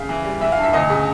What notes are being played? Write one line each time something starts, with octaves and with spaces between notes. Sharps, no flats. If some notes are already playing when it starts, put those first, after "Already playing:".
Already playing: C#3 F5
E3
G3
E3 E5
F5
G2
E5
D2 D#5
C#3